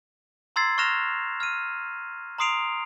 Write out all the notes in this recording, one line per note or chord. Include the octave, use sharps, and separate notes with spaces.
A#5 C6 E6 G#6 A6 C7
C#6 F6 F#6 A#6 E7 F7
F6 D#7
A#5 C6 D#6 C7 D7 F7